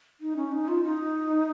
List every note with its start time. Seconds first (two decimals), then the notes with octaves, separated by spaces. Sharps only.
0.21 D#4
0.36 C#4
0.52 D#4
0.68 F4
0.84 D#4